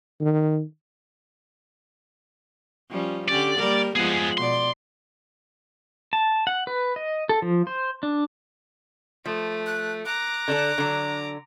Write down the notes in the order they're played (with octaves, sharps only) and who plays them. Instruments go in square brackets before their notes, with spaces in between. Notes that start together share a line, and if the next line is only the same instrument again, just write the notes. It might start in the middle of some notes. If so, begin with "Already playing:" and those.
[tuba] D#3
[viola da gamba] F3 G3 C#4
[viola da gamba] D3 C#4 G4 [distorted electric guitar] D5
[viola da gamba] G3 A#3 A#4
[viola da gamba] F3 G#3 B3 [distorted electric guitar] G#4 F#5
[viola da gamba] B2 D5 [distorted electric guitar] C6
[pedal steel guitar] A5
F#5
B4
D#5
A4
F3
C5
D4
[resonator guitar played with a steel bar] F3 [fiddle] A3
[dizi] F#6
[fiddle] A#5 D6 [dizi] F#6
[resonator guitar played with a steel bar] D3 D4 A4
D3 F#3